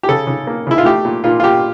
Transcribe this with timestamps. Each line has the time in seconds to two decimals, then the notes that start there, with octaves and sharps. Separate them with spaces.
0.03 G4
0.08 C#3 A4
0.27 C#3
0.47 A#3
0.67 C#3 E4
0.78 F4
0.85 A3 G4
1.05 A#2
1.24 A#2 F4
1.40 F4
1.43 A#2 G4